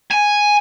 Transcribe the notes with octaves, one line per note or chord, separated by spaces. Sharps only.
G#5